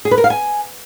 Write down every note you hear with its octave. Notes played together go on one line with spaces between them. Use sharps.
G#4
B4
A#4
F5
G#5